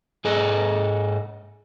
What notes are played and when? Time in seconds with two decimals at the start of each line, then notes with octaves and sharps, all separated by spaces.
0.25 G#2 G#4 A4 D#5